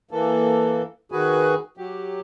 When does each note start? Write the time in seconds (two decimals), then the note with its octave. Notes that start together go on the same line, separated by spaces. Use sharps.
0.11 E3 A#3 A4
1.12 D#3 F#4 G#4 B4 G#5
1.77 F#3 G4